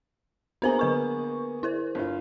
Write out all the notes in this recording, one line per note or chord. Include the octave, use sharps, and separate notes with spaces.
A#3 B3 D4 G#4 C5 A#5
D3 B4 C#6
E4 A#4 C5
G1 F4